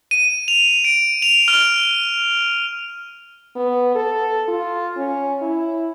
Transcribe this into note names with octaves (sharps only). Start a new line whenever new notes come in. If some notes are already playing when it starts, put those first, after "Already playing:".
D#7
F7
D7
F7
F6
B3
A4
F4
C#4
E4